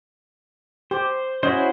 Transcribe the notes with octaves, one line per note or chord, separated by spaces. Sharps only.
G4 C5
C#4 E4 F#4 C5 C#5 D#5